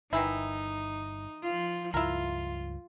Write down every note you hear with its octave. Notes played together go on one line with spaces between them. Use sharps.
G1 D#3 E3 D#4 E4
F3 F4
C#2 G2 F3 E4 F4 A#4